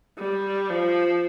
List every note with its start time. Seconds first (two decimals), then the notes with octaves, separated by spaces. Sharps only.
0.18 G3
0.70 F3